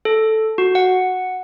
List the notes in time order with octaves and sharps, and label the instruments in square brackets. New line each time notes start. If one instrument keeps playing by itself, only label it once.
[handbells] A4
F#4
F#5